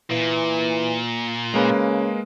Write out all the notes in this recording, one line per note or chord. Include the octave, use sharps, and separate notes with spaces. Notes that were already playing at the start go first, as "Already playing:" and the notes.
A#2 E3
C#3 G#3 A#3 B4